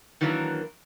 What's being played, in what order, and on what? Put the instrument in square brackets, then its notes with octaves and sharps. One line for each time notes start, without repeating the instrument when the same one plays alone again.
[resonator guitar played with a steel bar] D#3 E3 F#3 A#3 D4 A#4